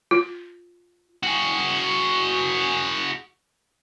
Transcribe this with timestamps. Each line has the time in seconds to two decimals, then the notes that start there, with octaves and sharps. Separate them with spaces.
0.11 F4
1.23 F#4 G#4